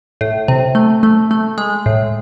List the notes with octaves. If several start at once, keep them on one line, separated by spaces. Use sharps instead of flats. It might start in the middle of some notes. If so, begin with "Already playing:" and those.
A2
C3
A3
A3
A3
G#3
A2